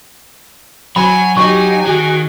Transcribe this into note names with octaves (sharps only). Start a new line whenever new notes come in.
F#3 G#5 B5
F#3 D#4 G4 G#5 C#6
D#3 F#4 G#4